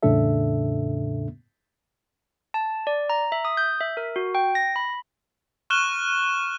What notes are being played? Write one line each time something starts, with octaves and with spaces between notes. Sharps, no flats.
E2 A2 C#3 D4 A4 E5
A5
D5
A#5
E5
D#6
G6
E5
A#4
F#4
G5
A#6
B5
C#6 F6 F#6 E7 G7